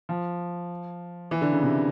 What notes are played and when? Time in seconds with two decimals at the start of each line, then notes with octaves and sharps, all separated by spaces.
0.09 F3
1.31 E3
1.41 D3
1.52 C#3
1.63 C3